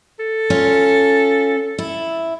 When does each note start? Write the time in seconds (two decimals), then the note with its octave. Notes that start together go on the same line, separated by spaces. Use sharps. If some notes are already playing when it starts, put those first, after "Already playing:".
0.19 A4
0.50 C#4 F4
1.79 E4